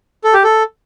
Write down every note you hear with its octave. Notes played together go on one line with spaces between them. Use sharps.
A4
G4
A4